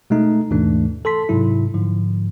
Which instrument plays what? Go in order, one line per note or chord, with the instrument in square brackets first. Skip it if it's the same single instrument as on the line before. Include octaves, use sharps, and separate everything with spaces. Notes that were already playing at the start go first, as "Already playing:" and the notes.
[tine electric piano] B2 G#3 A3 D#4
D#2 G#2 B2 E3 A3 D4
A4 A5 C6 B6
G#2 C3 F#3 E4
G#2 D3 F3